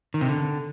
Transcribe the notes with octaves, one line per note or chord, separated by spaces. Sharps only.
D#3
C3
D3